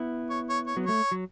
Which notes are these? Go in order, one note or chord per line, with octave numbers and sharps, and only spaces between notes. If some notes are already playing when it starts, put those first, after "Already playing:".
Already playing: B3 E4
C#5
C#5
C#5
F#3 B3
A3 C#5
F#3